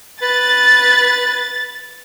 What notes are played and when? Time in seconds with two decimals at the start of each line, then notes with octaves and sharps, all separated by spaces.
0.22 B4 A6